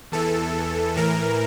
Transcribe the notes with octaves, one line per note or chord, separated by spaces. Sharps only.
E2 E3 A4
A2 E3 A#4